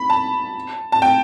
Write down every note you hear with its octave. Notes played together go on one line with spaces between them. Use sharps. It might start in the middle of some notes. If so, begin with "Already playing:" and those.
Already playing: B5
A5
A5
G5